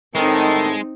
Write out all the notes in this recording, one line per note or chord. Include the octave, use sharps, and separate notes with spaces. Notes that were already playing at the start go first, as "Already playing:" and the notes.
A2 D#3 G#3 C4 D#4 A4